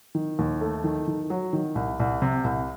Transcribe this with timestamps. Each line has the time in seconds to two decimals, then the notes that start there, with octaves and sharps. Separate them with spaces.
0.15 D#3
0.39 D#2
0.61 A3
0.84 D#3
1.08 D#3
1.30 F#3
1.53 D#3
1.75 C2
2.00 C2
2.22 C3
2.44 C2